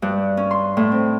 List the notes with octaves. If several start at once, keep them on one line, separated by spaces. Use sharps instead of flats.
G2
C#4
C6
A2
C4